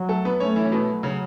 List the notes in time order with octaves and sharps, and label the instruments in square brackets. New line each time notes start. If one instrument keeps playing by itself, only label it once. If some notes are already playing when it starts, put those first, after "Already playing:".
Already playing: [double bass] F#3
[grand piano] A3 A4
B3 B4
[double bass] A3 [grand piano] C#4 C#5
[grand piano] E3 E4
C#4
B2 B3
[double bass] F#3
[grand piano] C#3 C#4